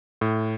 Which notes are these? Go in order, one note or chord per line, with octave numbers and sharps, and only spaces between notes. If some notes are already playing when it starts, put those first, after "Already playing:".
A2